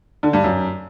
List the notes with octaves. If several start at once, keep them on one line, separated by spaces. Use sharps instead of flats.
D3
G2
F#2